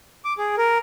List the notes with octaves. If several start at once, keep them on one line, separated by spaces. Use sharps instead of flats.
D6
G#4
A#4